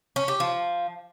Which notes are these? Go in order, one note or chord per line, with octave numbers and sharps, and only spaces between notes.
C#4
G4
F3